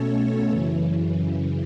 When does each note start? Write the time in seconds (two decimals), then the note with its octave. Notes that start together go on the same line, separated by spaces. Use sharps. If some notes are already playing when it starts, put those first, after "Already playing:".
Already playing: B2 A3 C#4 A4 C#5
0.49 F#2 C#3 E3